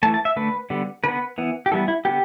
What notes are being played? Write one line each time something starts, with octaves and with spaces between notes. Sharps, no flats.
E3 A3 A5
A5
E5
D3 A3 B4
D3 G3 B3
D3 B3 B4
E3 B3
G4
E3 G3 B3 A4
E4
D3 B3 G4